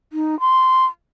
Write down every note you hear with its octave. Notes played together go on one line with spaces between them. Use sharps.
D#4
C6